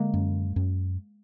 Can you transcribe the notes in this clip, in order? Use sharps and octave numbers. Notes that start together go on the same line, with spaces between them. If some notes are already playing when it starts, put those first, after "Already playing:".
Already playing: D3 G#3 A#3
F#2
F#2